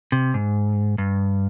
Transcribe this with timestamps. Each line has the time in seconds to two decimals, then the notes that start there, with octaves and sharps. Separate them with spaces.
0.12 C3
0.34 G#2
0.98 G2